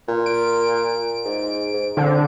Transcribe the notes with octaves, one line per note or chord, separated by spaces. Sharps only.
A#2
D7
G#2
G#2
D3 C4